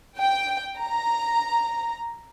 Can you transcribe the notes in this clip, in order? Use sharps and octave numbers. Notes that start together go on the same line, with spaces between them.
G5
A#5